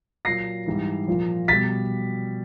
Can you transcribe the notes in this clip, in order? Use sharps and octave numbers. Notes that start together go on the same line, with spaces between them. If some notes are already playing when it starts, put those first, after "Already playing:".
A#2 F#3 A#6 C7
G#2 E3 G3
A#2 F3
B2 G3 A6 B6